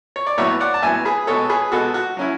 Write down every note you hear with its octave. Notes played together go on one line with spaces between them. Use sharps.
C#5
D5
A2 F#3 B3 C#5 E5
D5 F#5
A5
A2 F#3 B3 E5 G#5
G#4 B4
B2 G#3 B3 A4 C#5
G#4 B4
B2 G#3 B3 F#4 A4
F#4
F#3 C#4 E4